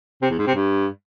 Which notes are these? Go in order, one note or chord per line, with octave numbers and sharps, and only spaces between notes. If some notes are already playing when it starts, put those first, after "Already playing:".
C3
E2
G#2
C3
G2